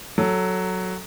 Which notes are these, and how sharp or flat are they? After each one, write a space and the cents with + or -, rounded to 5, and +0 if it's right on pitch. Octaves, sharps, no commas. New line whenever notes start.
F#3 +0 A4 +0